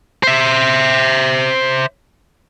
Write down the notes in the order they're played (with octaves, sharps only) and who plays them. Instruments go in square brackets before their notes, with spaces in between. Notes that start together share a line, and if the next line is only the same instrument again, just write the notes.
[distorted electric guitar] C5 E5